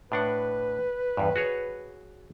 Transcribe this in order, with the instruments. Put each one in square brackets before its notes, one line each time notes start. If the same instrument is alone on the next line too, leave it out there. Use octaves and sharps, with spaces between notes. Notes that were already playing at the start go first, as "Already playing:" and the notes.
[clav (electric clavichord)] A2 D4 F#5 [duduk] B4
[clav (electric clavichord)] E2 G2
F#4 G#4 C#5